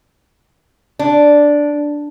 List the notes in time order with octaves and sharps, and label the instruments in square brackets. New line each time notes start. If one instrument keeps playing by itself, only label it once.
[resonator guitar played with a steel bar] D4